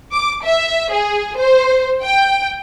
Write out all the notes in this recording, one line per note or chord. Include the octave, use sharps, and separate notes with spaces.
D6
E5
G#4
C5
G5